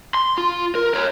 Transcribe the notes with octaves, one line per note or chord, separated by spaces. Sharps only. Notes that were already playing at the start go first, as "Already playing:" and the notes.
C6
F4
A#4
A#4 C#5